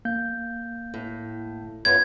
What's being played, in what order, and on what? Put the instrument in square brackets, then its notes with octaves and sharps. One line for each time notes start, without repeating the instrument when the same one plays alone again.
[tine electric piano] A#3 F5 G6
[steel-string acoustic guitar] A2
[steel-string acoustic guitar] F#2 B3 F4 [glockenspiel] G#6